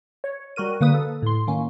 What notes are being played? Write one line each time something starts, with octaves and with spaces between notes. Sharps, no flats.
C#5
G3 F#4 A#4 D#7
D3 A#3 B4 D#6
A4
A2 C6
D#3 A#3 C#4